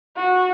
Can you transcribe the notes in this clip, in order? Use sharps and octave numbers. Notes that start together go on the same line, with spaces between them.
F#4